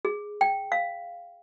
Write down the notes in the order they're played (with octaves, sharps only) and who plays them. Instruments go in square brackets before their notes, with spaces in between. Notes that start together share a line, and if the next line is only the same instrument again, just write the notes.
[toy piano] G#4
G5
F5